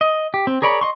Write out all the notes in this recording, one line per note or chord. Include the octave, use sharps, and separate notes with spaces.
D#5
G4
C4
G#4 A#4 C#5 D5 B5
D#5 C6 C#6